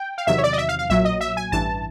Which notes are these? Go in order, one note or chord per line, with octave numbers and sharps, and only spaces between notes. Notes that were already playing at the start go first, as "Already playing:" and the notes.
Already playing: G5
F5
E2 C3 D#3 F#3 E5
C#5
D5
D#5
E5
F5
F5
B1 A#2 F#3 E5
D#5
E5
G#5
A1 G2 E3 A5